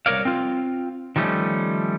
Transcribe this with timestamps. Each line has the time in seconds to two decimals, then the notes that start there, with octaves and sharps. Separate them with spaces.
0.06 C2 A#4 C#5 D5 F5
0.25 C4 F4
1.16 D#3 F3 G3 A3 C#4